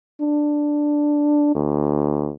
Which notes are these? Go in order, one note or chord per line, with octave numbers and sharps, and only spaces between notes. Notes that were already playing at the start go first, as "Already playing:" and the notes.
D4
D2